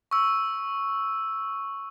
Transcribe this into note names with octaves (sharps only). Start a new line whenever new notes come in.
C#6 E6